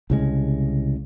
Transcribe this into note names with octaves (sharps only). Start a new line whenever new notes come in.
C2 C#3 G#3